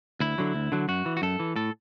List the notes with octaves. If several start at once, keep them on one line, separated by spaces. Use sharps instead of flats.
D2 E4
D3 F#3
D2
D3 F#3
F#2 F#4
E3
F#4
F#2 A4
E3
A2 A4